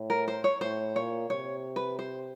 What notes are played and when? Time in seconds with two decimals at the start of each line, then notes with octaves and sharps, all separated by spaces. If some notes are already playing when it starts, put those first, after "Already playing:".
Already playing: A2
0.10 A#4
0.28 C5
0.44 C#5
0.61 A2 C5
0.96 A#2 C#5
1.30 C3 C#5
1.76 B4
1.99 C5